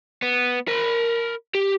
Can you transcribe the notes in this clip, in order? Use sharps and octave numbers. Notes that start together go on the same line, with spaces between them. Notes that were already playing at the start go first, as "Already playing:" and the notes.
B3
A#4 B5
G4